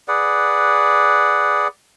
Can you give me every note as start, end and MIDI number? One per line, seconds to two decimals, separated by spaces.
0.08 1.68 68
0.08 1.68 71
0.08 1.68 74
0.08 1.68 78